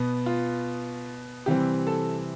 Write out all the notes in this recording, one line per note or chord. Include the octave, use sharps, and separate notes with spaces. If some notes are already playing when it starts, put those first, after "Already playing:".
Already playing: B2 B3
F4
C3 E3 G3 C4 G4
A4